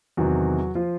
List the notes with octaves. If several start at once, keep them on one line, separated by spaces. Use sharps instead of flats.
E2 C3 D#3 F#3 F#4
F3 F4